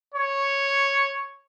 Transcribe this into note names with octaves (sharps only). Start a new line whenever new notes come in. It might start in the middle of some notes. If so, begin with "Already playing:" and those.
C#5